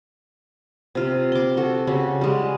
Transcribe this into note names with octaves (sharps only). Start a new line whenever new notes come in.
C3 F4
C6 D6
F#4 A4
C#3 F#4 G4
G3 G#3